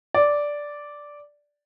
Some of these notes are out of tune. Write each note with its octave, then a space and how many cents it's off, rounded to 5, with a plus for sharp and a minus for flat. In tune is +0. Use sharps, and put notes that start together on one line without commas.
D5 -5